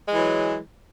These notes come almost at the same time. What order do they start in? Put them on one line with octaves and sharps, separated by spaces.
G#3 E3 F#3